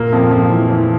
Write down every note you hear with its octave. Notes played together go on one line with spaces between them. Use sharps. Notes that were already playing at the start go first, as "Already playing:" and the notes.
Already playing: A#2 A#3
F2 F3
F2 F3
E3
E3